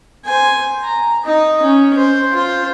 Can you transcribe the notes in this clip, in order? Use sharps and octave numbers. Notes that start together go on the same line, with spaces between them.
C5 G#5
A#5
D#4 D#5
C#4
C5
F4 C5